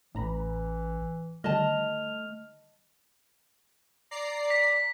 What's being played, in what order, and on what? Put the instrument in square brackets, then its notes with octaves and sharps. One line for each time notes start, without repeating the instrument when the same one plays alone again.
[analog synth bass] A1 [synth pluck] A2 A#5 B5 [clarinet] E3
[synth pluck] D3 D#3 G3 [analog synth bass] A3 [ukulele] D#5 A5 [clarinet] F6
[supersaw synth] D5 A#5 C7
[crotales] B6